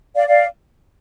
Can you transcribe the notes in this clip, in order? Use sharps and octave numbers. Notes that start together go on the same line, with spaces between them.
D5 F5
D5 F5